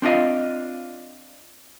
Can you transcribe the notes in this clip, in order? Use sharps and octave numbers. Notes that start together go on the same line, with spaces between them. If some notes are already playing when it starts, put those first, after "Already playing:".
C4 D4 F4 D#5 F5